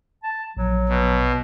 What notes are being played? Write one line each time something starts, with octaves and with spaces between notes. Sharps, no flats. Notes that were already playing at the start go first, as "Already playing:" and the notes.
A5
A#1 F#3
B2